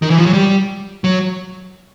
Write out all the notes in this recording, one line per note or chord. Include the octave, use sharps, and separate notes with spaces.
D#3
E3
F3
F#3
G3
F#3